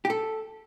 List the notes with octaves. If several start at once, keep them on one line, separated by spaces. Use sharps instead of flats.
G4
A4